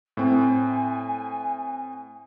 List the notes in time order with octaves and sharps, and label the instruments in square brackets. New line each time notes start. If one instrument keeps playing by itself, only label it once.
[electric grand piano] A2 C4 [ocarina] G#5